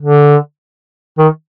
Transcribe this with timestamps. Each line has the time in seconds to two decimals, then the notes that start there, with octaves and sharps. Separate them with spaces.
0.01 D3
1.18 D#3